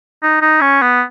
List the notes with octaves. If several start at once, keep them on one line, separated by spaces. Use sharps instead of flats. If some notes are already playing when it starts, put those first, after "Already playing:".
D#4
D#4
C#4
B3